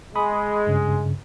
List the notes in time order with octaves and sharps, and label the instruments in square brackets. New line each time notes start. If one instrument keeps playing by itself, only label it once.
[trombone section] G#3 [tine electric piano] B5 D#6
[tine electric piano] G2 C#3